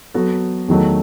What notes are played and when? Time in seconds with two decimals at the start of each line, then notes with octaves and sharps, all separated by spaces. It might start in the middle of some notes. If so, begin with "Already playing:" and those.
0.14 F#3 B3 F#4 A4
0.68 E2 D#3 F#3 A3